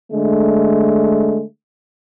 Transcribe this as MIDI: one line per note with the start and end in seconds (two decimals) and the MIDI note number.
0.12 1.43 50
0.12 1.43 56
0.12 1.43 57